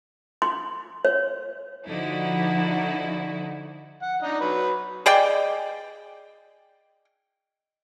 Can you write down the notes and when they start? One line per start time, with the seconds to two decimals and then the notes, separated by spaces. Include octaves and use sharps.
0.42 C6
1.05 C#5
1.87 D3 F3 D#4 E4 F#4
4.02 F#5
4.22 D4 D#4 D#5
4.41 F#3 B4
5.06 G#4 D5 D#5 G5